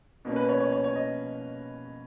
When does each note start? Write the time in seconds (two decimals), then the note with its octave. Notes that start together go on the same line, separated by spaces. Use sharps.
0.25 B2 A#3 C#4
0.36 B4
0.49 C#5
0.60 C#5
0.72 C#5
0.84 C#5
0.96 D#5